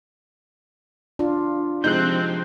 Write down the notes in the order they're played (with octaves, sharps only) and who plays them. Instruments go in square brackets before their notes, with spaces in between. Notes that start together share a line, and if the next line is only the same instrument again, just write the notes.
[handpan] D4 F4
[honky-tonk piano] C3 G#3 D#4 [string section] F3 C4 [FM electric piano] F#6 G6